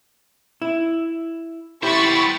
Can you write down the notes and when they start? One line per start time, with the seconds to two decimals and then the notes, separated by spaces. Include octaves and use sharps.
0.62 E4
1.83 B3 E4 G4 C5 B5 C#6 A6